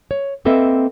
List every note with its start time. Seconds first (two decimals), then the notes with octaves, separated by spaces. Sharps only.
0.11 C#5
0.45 A#3 C4 A4 B4 D#5 E5